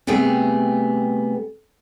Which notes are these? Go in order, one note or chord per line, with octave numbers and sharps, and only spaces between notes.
C3 G3 A3 B3 G#4